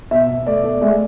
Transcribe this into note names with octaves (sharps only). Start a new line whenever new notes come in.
B2 E5
B2
A3 D5
A3
G#3 E5